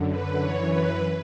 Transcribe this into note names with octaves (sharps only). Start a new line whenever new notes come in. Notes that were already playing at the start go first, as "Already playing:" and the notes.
Already playing: F#2 D3
B4
F#2 E3 C#5
B4